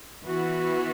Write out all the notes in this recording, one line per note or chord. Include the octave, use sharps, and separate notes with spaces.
E3 B3 F#4